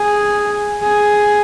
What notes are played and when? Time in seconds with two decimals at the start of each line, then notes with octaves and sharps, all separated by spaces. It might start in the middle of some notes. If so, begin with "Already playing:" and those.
Already playing: G#4
0.83 G#4